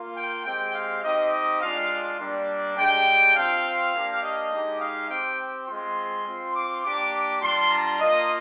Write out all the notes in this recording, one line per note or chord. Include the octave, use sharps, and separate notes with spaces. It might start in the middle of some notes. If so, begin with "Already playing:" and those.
Already playing: A#3 F4
G5
G#3 C4 G4 G5
F5
C4 D#4 G4 D#5
D#5
G#3 D4 F4 F5
G3 A#3 D4
G#3 D4 G4 G5
C4 F4 F5
A#3 D4 G4
D#5
G#3 D#4 G4
F5
C4 G4 G5
G#3 C4 F4 C6
C4 F4
D6
A#3 D4 G4 D6
D6
G3 D4 F4 C6
A#5
A#3 F4 D#5